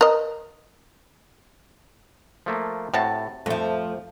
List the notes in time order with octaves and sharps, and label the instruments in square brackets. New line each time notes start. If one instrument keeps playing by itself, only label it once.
[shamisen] A#4 D#5
[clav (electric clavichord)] F3 A3 A#3
[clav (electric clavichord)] A2 [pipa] C3 F#4 A5
[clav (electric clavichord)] F2 [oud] F3 A3